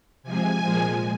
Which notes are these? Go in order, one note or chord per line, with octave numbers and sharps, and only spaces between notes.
C3 F3 G#3 G#5
A#2 F3 G#3